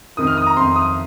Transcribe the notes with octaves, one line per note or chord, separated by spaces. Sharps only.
F2 D#3 C4 D#6
F6
D#6
A#5
F2 D#3 C4 C6
D#6